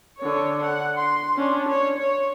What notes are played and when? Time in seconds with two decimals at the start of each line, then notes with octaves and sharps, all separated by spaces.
0.18 D3 C#5
0.64 F#5
0.97 C6
1.36 C#4 D4
1.69 C#5
1.98 C#5